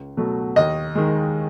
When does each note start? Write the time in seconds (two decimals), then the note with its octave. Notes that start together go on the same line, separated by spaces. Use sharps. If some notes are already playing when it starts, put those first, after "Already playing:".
Already playing: C#2
0.17 B2 F#3 A3
0.56 D#2 D#5
0.95 D#3 G#3